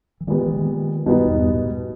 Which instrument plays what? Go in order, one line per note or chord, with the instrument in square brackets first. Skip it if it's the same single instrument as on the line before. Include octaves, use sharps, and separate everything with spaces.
[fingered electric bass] E3
[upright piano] A#2 G#3 B3 G4 [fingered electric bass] D#3
[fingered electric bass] E3
D#3
[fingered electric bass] G2 [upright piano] B2 G3 B3 D#4
[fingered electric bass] E2
G2
A#2
G#2